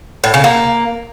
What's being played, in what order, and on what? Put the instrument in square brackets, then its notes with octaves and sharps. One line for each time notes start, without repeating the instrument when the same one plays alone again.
[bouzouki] A2
C#3
A#3